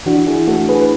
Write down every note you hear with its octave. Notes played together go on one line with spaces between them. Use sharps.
E3 D4 F#4
E4 G#4
A3 F#4 A4
G#4 B4
B4